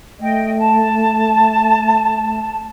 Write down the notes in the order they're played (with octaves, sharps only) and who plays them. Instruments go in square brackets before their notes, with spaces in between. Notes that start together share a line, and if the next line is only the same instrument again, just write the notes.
[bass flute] A3 [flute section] D#5 G5
[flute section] A5